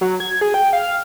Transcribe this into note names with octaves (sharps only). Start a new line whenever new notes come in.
F#3
G#6
G#4
G5
F5